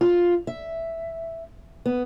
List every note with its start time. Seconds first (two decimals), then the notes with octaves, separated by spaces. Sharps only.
0.01 F4
0.47 E5
1.86 B3